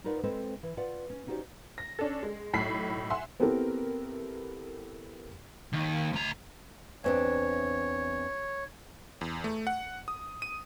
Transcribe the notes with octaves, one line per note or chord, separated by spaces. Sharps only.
D#4 F4 A#4 B4 D5 F#5
G#3 C4 A4 B4 C5 D#5
E3
F4 B4 D5 F#5
C#4
C#4 D#4 F#4 G4 C5 D5
A#6
C#4 D4 A4
G#3
B1 A2 B5 E6 B6 C7
E5 F#5 G#5 C6 E6
B3 C4 E4 G4 A4 A#4
D#2
D2 A#5
E2 C4 D4 C#5
E2
A3
F#5
D#6
D#7